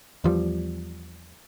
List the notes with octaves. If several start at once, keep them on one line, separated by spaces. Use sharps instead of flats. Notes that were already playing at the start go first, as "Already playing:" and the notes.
E2 F3 G3